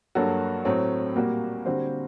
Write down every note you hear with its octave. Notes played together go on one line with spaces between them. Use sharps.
G2 F#3 A#3 F#4 A4
A2 F#3 A3 C4
A#2 G3 A#3 F#4
D3 G3 C4 F#4 C5